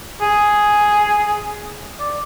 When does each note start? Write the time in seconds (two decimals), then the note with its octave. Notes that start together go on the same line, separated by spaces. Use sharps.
0.22 G#4
2.00 D5